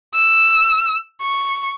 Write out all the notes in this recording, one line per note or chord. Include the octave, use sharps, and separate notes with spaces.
E6
C#6